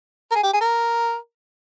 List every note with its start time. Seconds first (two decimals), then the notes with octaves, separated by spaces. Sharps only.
0.31 A#4
0.35 G#4
0.43 G4
0.53 G#4
0.61 A#4